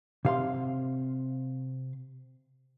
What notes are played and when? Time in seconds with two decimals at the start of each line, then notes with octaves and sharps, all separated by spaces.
0.25 C3 F5 C6